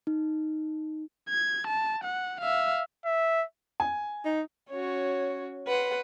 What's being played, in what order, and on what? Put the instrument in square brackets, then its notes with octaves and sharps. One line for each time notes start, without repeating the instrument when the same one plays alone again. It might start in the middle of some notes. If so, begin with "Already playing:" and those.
[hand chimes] D#4
[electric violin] G#6
A5
F#5
E5 F5
[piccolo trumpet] E5
[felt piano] G#5
[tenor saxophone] D#4
[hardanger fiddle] C#4 F#4 [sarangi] C#5
[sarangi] B4 [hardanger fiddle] F#5 C6